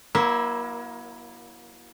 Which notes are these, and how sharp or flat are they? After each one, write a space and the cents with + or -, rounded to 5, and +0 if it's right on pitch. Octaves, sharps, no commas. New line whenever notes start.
F#3 +0 A#3 +30 E4 +0